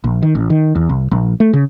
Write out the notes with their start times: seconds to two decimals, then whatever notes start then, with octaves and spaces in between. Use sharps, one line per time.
0.04 A#1
0.23 D#3
0.35 A1
0.50 D#3
0.75 E2
0.89 C2
1.11 A#1
1.40 A3
1.53 C#3